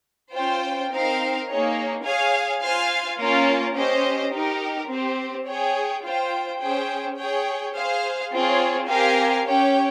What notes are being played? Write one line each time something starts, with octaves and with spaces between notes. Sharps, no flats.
C#4 F4 C5 G5
C4 D#4 A#4 F5
A#3 D#4 G#4 C#5
G#4 C#5 F5 G#5
F4 C5 F5 G#5
A#3 C#4 F4 A#4
C#4 G4 C5 D#5
D#4 G4 A#4
C4 G4 C5
G#4 C#5 G5
F4 C5 G5
C#4 G#4 C5 G5
G#4 C#5 G5
G#4 C5 F5
C4 F4 G#4 C#5
C4 G4 A#4 F5 G#5
C#4 G4 C#5 G5